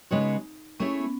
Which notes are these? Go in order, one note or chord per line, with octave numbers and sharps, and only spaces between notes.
C#3 G#3 B3 D#4 F#4 C#5
A3 C#4 E4 G#4 C#5
B3